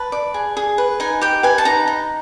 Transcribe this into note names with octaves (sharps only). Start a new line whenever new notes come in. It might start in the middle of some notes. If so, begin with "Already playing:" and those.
Already playing: B4 A5
D5
G#4
G#4
B4
D#4 G#5
G4 G5
B4 G#5
A5
D#4 A#5
D#4